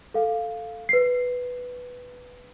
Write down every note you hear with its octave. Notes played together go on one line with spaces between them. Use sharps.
A4 F5
B4 C7